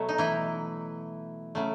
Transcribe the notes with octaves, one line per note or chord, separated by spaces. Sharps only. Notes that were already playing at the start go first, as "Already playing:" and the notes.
Already playing: B2 F#3 A3
D#4
E3 E4
C#3 F#3 A3